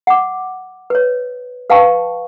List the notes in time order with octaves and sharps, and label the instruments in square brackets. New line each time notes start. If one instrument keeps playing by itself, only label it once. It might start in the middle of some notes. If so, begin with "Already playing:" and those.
[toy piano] F#5 D6
B4 C#5
B4 F5 G5 A5 C#6